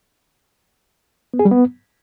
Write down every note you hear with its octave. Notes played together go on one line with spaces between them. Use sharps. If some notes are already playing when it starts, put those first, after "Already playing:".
B3
G#4
G3
B3